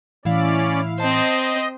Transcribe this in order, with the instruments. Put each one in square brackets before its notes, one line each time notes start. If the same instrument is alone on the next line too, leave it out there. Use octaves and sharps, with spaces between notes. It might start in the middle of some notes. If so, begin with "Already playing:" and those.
[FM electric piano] A2 E3 [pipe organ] C#4 D5 [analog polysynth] E4 F5
[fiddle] C4 C5 [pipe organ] D#5 [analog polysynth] A5 C7